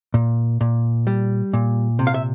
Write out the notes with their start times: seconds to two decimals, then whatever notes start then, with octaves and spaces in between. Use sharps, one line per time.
0.14 A#2
0.61 A#2
1.07 G3
1.53 A#2
1.99 C3
2.07 F5
2.14 E5